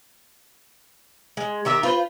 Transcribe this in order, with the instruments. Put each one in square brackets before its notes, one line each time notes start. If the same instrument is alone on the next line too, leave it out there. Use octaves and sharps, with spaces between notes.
[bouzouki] G#3
D#3 G4 E5 A#5
F4 B4 C5